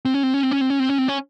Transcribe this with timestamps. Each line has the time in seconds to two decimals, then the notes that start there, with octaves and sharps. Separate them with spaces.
0.05 C4
0.14 C#4
0.23 C4
0.34 C#4
0.43 C4
0.51 C#4
0.61 C4
0.70 C#4
0.79 C4
0.89 C#4
0.98 C4
1.08 C#4